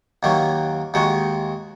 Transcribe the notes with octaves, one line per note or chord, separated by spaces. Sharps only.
D#2 D#3 F#3 A#3
D#2 D#3 G#3 F#4